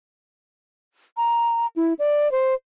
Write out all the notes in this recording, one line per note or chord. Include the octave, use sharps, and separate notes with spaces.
A#5
E4
D5
C5